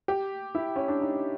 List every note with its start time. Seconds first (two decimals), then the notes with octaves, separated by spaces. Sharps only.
0.08 G4
0.55 E4
0.76 C#4
0.88 D4
1.01 D#4